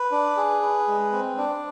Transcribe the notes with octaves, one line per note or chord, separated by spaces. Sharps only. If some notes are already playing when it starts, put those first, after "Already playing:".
Already playing: B4
D4
G#4
B4
G#3
C4
D4